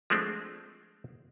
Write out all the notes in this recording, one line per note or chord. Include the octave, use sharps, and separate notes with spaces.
F3 G#3 A3 C4 D4